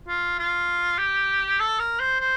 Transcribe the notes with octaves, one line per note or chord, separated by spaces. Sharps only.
F4
F4
G4
A4
A#4
C5
C5